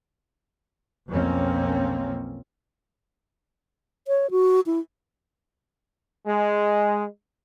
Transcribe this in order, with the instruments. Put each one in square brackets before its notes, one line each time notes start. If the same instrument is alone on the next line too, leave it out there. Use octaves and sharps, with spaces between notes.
[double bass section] B1 F2 A#3 C4 C#4
[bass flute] C#5
F#4
E4
[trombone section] G#3